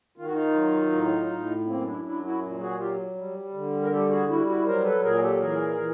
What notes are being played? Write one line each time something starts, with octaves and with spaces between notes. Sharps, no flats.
D#3 F4
F#4
D#4 F4
F#3
A2
A2
F#2 A#3 C4
D4 E4
F#3 D4 E4
E4 F#4
A#2
F#4 G#4
F#3 F4 G4
G3
D3
A#4
G3 G4 A4
F#4 G#4
G3 E4 F#4
E4 F#4
F#3 A#4 C5
A4 B4
A#2 G#4 A#4
G4 A4
E3 G#4 A#4
E3